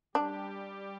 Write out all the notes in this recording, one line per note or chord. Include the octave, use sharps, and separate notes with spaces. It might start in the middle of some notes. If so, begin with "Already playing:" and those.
G3 D4 G4